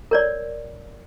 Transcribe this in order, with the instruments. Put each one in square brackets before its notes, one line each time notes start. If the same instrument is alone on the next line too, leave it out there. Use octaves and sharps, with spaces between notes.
[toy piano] A#4 C#5 D5